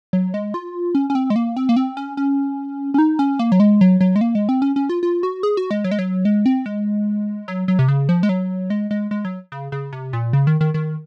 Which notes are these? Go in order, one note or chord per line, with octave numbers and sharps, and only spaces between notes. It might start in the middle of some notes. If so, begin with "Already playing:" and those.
F#3
G#3
F4
C#4
C#4
C4
G#3
A#3
C4
A#3
C4
C#4
C#4
C#4
D#4
C#4
A#3
F#3
G#3
F#3
F#3
G#3
A#3
G#3
C4
C#4
C#4
F4
F4
F#4
G#4
F#4
G#3
F#3
G#3
F#3
G#3
C4
G#3
F#3
F#3
C3
C#3
F3
G#3
F#3
G#3
G#3
G#3
F#3
C#3
C#3
C3
A#2
C#3
D#3
D#3
D#3